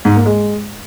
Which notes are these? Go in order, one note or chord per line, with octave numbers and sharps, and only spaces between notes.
G#2
A#3
G#3